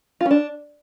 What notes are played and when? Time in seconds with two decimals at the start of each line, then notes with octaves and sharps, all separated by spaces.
0.21 F4
0.26 C#4
0.31 D4